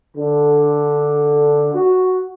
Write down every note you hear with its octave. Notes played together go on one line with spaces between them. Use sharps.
D3
F#4